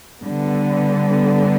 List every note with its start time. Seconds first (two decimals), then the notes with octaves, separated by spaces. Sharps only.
0.20 D3 G3 B3